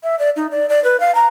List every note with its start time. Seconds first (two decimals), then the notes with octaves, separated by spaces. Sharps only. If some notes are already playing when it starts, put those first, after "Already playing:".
0.03 E5
0.19 D5
0.36 D#4
0.51 D5
0.69 D5
0.84 B4
1.00 F5
1.15 A#5